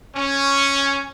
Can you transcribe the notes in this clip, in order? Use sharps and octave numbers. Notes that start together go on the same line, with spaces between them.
C#4